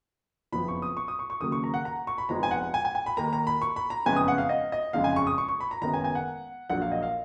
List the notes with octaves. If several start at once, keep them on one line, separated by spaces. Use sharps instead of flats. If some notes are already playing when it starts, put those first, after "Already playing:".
F#1 F2 F3 B3 B5
C#6
D#6
C#6
D#6
C#6
C#6
D#2 C#3 F#3 A#3 D#6
C#6
A#5
F#5
A#5
C#6
B5
F1 F2 F3 G#3 B3 A#5
G#5
F#5
G#5
G#5
G#5
B5
D#2 D#3 A#3 A#5
A#5
B5
C#6
B5
A#5
F#1 F2 C#3 G#3 B3 G#5
D#6
F#5
F5
D#5
D#5
F#1 F2 C#3 G#3 F5
G#5
C#6
D#6
C#6
C#6
B5
A#5
F#1 F#2 D#3 G#3 B3 A#5
G#5
G#5
F#5
A#1 A#2 F#3 A#3 F#5
F5
D#5
F5